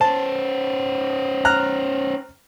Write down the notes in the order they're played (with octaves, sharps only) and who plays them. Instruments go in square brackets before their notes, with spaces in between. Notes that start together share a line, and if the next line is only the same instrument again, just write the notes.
[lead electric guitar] C#4 C5 [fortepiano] A5
[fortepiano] A#5 F6 F#6